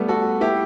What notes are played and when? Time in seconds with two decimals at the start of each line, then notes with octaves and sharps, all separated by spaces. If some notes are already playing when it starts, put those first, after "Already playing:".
Already playing: G3 A3 B3
0.08 F#4 A4
0.41 E4 G4